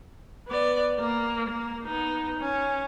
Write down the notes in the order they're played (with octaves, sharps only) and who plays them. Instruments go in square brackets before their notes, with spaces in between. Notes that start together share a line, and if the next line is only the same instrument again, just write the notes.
[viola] B3 D5
A#3
A#3
B3 D#4
C#4